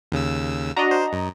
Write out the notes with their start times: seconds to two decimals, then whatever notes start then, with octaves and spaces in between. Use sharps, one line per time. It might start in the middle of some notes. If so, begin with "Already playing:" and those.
0.12 D#2 C#3 E6
0.76 D4 F#4 D#5 A#5
0.91 C5
1.13 F#2